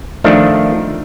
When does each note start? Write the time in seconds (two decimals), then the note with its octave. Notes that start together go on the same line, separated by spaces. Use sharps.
0.24 D#3 F3 A3 D4